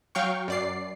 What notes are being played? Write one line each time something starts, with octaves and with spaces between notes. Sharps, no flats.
F#3 F5 G5 C#6
F#2 D5 C7